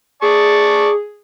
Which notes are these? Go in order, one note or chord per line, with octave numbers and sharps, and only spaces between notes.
G#4 D5 A5 C#6